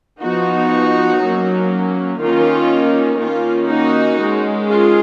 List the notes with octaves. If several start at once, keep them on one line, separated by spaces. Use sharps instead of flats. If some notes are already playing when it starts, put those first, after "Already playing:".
F3 B3 D#4 F#4
F#3 A#3 C#4
D#3 A#3 C#4 F4
D#3 A#3 C#4 F4
D#4 F#4
D#3 G#3 C#4
F4 G#4